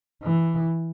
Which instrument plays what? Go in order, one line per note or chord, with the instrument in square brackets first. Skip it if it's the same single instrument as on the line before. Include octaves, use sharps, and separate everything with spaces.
[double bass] E3